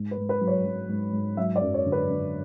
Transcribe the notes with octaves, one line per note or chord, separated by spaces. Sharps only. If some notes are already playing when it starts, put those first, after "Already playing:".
Already playing: G#2
B4
G#2
B4
F#3
C#5
F#3
G#2
G#2
F#3 E5
D5
F#2
C#5
D3
B4
D3